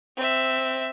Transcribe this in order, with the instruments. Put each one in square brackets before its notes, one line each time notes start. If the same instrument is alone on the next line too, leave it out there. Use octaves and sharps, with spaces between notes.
[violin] C4 E5